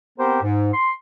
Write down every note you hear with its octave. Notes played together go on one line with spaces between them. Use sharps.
B3 C4 G4 A#4 C5
G#2
C6